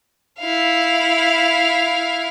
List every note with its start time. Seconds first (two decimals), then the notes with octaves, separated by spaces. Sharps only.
0.40 E4 F5